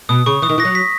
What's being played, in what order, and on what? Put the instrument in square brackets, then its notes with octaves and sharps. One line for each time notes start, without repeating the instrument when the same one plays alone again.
[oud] B2 [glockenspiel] D#6
[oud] C#3 [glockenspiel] C#6
[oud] E3 [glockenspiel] D#6
[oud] D#3
[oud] E3 [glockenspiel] A#6
[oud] F#3
[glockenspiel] B6